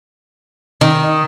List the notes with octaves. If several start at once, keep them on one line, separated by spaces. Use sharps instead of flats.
D#3